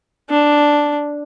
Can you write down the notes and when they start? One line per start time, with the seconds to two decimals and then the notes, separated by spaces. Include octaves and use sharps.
0.30 D4